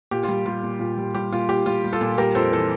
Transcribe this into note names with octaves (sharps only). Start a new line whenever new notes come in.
A#2 G4
G3 F4
G3 F4
A#2
A#2
G3
G3 G4
A#2 F4
A#2 G4
G3 F4
G3
F4 A4
A#2
G3 G4 A#4
F2 A4 C5
E3 A4 C5